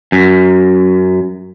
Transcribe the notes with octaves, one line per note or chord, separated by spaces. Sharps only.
F#2